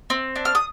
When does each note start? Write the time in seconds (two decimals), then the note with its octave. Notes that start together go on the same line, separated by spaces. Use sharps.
0.10 C4
0.36 D4
0.45 F6
0.55 D#6